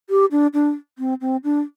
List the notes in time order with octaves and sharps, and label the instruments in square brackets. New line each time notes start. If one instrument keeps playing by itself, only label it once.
[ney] G4
D4
D4
C4
C4
D4